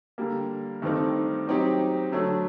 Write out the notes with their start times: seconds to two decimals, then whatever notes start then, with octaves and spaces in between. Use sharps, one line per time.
0.18 D3 G3 A#3
0.82 G2 D#3 A3 C4 D#4
1.47 F#3 C4 D#4 G4
2.12 D3 F#3 A3